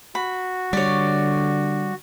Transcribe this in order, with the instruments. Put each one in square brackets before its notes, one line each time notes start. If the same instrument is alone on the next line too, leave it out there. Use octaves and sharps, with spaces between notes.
[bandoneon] F#4 [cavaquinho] B5
[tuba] D3 [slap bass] G3 [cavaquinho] C#5 D5